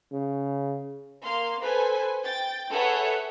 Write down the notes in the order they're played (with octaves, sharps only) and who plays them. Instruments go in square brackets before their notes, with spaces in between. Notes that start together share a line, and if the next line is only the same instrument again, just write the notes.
[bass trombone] C#3
[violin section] A#3 F5 C6
A4 B4 C5 G#5
G5 A6
G#4 A4 B4 C#5 E5 F#5